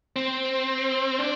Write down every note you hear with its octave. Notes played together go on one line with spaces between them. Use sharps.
C4
D4